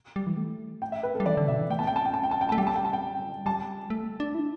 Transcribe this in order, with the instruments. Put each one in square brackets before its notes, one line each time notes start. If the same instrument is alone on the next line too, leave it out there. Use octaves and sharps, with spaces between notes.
[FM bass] G3
E3
A3
[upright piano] G5
E5
B4
A4
[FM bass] G3
[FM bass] E3 [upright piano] D5
[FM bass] D3
[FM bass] B2 [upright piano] E5
[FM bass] E3
[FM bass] A3 [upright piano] G5
[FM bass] B3 [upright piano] A5
[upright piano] G5
[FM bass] A3 [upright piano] A5
[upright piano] G5
A5
G5
A5
G5
[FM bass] A3 [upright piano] A5
[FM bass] G3 [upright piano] G5
[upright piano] A5
G5
A5
G5
[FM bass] G3 [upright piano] A5
[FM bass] A3
D4
E4